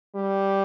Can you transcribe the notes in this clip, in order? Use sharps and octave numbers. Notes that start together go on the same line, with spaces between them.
G3